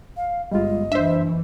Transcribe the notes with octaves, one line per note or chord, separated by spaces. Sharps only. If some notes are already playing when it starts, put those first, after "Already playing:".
F5
G1 G3 G#3 F4 D#5
F#1 E3 D4 C5 E5